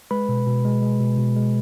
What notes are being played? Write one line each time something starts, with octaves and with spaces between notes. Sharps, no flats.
G#3 B4 B5
B2
B2
G#3
G#3
B2
B2
G#3